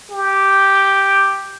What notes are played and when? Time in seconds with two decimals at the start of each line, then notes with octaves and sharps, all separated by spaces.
0.11 G4